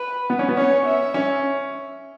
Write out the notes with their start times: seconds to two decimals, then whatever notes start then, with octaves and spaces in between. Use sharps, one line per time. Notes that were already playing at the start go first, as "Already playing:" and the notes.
Already playing: B4
0.30 B3
0.39 C#4
0.49 B3
0.57 C#4 C#5
0.86 E5
1.14 C#4